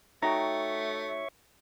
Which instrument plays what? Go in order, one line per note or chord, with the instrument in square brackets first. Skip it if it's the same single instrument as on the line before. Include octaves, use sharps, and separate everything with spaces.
[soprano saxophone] A3 [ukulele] D#4 F#4 G5 [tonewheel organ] C#5 E5 C#6 [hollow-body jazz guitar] A#5